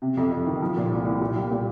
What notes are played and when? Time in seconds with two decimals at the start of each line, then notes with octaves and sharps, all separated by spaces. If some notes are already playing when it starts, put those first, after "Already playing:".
0.02 C3
0.17 F2
0.31 F2
0.46 D#3
0.62 F3
0.77 A#2
0.92 C2
1.05 C2
1.21 A#2
1.36 G3
1.51 A#2